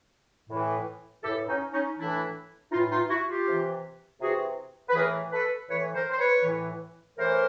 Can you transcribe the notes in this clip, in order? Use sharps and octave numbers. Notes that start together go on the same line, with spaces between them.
A2 E3
A2 E3 G4 A4
C#4 D#4
C#4 D#4
A2 E3 D4 E4
A2 E3 D#4 F4
D#4 F4
E4 F#4
F4 G4
C3 E3
C3 E3 F#4 G#4
B4
A2 E3 G#4 A#4
A4 B4
A2 E3 B4 C#5
A#4 C5
C5
B4 C#5
A2 E3
A2 E3 A#4 C5